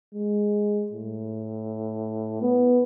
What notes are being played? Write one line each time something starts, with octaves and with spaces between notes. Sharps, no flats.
G#3
A2
B3